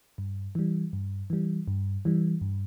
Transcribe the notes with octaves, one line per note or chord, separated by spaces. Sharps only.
G2
E3 G3
G2
E3 G3
G2
E3 G3
G2